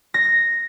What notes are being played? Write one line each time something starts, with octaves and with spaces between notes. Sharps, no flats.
A#6